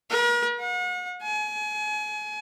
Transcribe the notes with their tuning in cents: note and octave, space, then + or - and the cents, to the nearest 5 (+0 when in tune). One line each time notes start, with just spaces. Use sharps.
A#4 +45
F#5 -40
G#5 +30